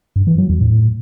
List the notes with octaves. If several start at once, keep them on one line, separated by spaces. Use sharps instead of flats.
G2
E3
F#3
E2
A2